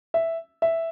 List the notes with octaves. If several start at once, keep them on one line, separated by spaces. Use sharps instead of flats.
E5
E5